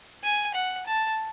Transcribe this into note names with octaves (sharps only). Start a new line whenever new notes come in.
G#5
F#5
A5